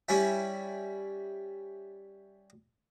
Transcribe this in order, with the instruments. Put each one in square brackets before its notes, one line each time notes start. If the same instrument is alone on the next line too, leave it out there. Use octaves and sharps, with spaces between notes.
[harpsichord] G3 C#4 E4